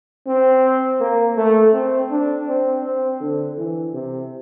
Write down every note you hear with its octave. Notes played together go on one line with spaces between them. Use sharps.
C4
A#3
A3
C4
D4
C4
C4
D3
E3
C3